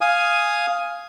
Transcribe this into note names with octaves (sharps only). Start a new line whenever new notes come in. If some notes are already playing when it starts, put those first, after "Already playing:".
F5 G#5 D#6